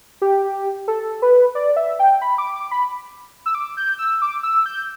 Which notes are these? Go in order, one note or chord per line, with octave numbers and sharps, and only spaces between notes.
G4
A4
B4
D5
E5
G5
B5
D6
D6
B5
E6
D6
G6
E6
D6
E6
G6